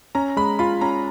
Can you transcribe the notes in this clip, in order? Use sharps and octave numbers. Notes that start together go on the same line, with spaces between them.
C#4 A#5
G#3 B5
F4 B5
C#4 A#5